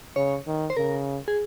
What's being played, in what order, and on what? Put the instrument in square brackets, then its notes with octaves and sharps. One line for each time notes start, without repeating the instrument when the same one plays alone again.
[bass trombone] C#3 [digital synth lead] C#5
[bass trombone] D#3
[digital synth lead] C5
[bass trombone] C#3 [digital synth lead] A#4
[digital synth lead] G#4